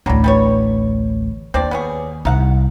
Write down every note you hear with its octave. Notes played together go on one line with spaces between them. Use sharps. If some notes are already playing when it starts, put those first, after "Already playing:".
A1 D2 F#3 G3
G3 B3 C#5
D#2 C4 D4 D5
B3 C#4 G#4
C2 D#4 F5 F#5